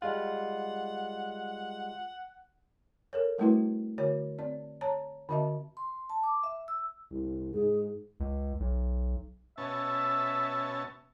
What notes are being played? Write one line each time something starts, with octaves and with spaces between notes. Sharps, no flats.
G3 G#3 F4 F#5
A4 A#4 C#5
G3 A3 C4 E4 F#4 B4
D3 F#4 C#5
C4 D5
C#5 A5 A#5
D3 C4 F#4 D#5 E5 A5
C6
A5
D6
E5
E6
C2
G#2 G#4
C#2
B1
B2 C#4 E5 A5